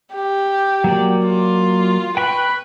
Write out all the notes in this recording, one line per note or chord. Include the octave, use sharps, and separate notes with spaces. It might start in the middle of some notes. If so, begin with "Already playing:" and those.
G4
F#3 A#3 D5
F4
B4 G5 B5 C#6